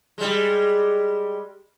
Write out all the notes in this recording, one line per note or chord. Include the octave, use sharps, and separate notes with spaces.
G3 G#3